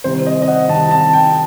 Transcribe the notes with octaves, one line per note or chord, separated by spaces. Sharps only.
C2 C3 D#3 C5
D#5
D#5
F#5
C2 C3 D#3 A5
A5
G5